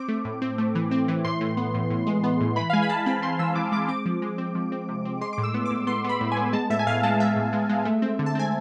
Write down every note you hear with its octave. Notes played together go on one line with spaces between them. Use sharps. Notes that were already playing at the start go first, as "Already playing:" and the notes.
Already playing: C4 D6
A3
A2
C4
A3
E3
C4
E3
A2 C6
A2
B3
A2
A2
G#3
B3
A2
E3 B5
F5
G#3 G#5
B5
G#3 A5
C4 B5
C4 C6
E3 E6
E3 D6
G#3 D6
C4 D6
F3
G#3
C4
F3
C4
C3
C4
G#3 C6
A2 D6
E6
B3
A2 D6
B3 C6
B3 B5
A2
G#5
B3
G#3 A5
A2 E5
G#5
A2 F5
G#3 A5
G#3 E5
A2
G#3
G#3
A3
C4
D3
A5
C4 G#5